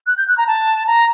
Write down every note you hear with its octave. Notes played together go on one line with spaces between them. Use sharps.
F#6
G6
F#6
A#5
A5
A#5